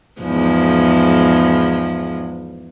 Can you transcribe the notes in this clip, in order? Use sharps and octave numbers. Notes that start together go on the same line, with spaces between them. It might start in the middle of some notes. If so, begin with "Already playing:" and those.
E2 G#2 F3